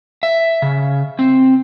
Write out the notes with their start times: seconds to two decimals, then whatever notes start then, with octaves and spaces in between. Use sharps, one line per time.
0.23 E5
0.62 C#3
1.19 C4